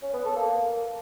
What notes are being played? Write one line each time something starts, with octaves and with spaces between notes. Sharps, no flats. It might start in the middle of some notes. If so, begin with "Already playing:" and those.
C#4
B3
A4
A#3